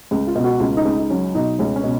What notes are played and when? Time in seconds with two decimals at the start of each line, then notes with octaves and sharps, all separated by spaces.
0.11 C#2
0.27 F4
0.35 B2
0.44 F#4
0.60 C#2 F4
0.77 D#4
0.85 C#2
0.99 D#4
1.10 F#3 C#4
1.35 B2 D#4
1.59 C#2 C#4
1.76 C#4
1.84 B2